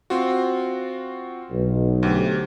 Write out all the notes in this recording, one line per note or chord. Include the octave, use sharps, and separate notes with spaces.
C4 F4 F#4
B1
D2 G4 C5